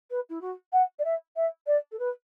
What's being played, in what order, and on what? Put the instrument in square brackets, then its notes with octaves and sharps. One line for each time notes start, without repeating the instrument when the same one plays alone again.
[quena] B4
E4
F#4
F#5
D5
E5
E5
D5
A4
B4